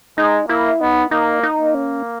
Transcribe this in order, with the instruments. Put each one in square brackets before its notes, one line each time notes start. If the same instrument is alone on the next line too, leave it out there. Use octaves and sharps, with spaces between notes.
[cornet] G#3 [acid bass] D#4
[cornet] A#3 [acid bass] E4
[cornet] B3 [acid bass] D#4
[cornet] A#3 [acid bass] D#4
[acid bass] D#4
[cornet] A#3
[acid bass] C#4